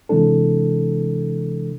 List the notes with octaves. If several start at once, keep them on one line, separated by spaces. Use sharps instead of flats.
C3 E3 G#3 D4 A4